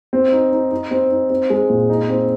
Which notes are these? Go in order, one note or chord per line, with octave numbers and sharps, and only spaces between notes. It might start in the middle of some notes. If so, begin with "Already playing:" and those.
C4
D#4
D#4
D#4
C4
D#4
C4
G#3
A#2
D#4
C4